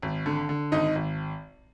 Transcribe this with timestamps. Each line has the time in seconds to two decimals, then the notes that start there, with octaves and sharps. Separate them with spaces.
0.02 G#1
0.26 D3
0.49 D3
0.72 G#1 D#4 D#5
0.95 G#1